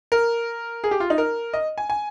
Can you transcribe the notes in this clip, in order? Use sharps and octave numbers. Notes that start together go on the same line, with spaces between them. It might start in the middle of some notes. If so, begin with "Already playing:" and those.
A#4
G#4
G4
F4
D#4
A#4
D#5
G#5
G#5